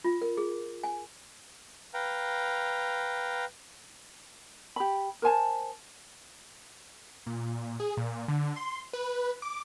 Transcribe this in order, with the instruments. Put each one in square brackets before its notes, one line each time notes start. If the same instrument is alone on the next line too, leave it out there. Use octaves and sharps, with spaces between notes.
[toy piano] F4
A#4
G#4
G#5
[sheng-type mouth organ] B4 F5 G5 A#5
[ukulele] G4 B5
A#4 C5 G#5 A5
[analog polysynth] A#2
G#4
A#2
D3
C6
B4
D6